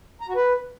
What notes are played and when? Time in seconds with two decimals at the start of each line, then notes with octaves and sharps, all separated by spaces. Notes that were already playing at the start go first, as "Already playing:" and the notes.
0.21 A#5
0.28 F#4
0.36 B4